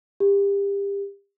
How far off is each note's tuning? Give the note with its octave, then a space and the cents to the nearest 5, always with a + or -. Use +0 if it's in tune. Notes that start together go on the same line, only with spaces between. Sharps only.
G4 +30